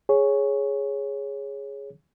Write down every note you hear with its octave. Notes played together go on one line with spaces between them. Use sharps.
G#4 C#5